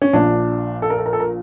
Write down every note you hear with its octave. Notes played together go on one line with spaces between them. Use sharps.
C#4
A#1 A#2 D4
A4
A#4
A4
A#4
A4
A#4